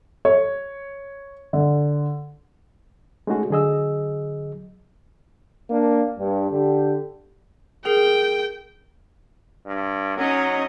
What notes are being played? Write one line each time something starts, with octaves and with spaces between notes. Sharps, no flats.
C#5
D3
G#3 A3 C#4 D#4 F#4 G#4
D3 F#3 G#4 D#5 E6
A#3 D4
G2
D3 G4
G#4 A#4 G5 C7
G2
F#3 C#4 D#4 D#5